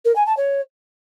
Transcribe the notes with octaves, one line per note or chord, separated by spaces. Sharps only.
A#4
G#5
A5
C#5